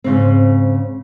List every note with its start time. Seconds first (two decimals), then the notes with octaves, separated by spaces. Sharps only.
0.04 G#2 C#3 C4